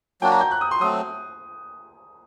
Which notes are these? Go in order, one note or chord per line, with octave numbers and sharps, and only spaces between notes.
F#3 A#3 D4 F#4 G5
A#5
G6
F#6
D#6
C6
F#3 A3 C4 D#6